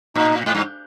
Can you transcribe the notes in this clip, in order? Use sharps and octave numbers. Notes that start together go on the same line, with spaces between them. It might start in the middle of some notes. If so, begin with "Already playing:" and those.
A2 D#4
G#2
G2